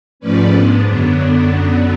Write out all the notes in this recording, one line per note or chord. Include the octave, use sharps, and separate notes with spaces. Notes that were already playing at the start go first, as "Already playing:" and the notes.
G#2 F3 A3 C#4 B4 D5
G#2 G#3 B3 D4
F#2 D3 F#3 B3 D4